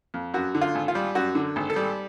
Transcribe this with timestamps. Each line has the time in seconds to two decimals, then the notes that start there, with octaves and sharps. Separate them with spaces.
0.14 F2
0.34 F#2 F#4
0.55 D3
0.62 F4
0.75 G#1
0.88 F4
0.95 G3
1.15 F#2 F#4
1.35 D3
1.56 G#1
1.70 A4
1.76 G3